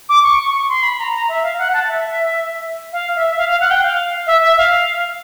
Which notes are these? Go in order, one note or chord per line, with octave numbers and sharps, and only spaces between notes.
D6
C#6
C#6
C6
B5
A#5
A#5
E5
F5
F#5
A5
E5
F5
E5
F5
F5
F#5
G5
F5
E5
E5
F5